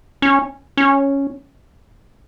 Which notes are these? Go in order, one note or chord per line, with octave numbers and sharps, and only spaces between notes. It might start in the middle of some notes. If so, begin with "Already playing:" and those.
C#4
C#4